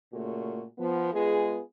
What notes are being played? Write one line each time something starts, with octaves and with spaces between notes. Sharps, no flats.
A#2 C#3 A3 F#4
F3 B3
G#3 B3 F4 G#4